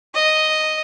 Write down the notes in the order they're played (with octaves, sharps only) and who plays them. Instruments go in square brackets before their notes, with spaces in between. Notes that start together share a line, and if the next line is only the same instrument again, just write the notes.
[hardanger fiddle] D#5